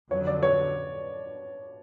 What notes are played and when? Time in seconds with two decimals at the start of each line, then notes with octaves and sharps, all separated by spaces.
0.11 F2 D3 F#3 C#5
0.27 D5
0.43 C#5